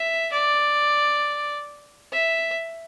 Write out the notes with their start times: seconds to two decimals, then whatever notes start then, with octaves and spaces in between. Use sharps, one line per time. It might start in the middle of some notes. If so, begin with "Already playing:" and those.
Already playing: E5
0.32 D5
2.13 E5